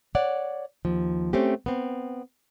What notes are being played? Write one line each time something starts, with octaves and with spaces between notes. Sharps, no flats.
C#5 D5 F#5
D#2 F3
A3 C4 C#4 G4
B3 C4